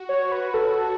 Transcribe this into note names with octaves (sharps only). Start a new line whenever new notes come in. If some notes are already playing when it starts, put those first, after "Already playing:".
Already playing: F#4
C#5
B4
A4
A4